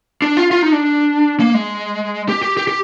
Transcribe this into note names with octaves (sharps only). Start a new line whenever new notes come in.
D4
F4
F4
D#4
D4
A#3
G#3
G4
G4
G4
G4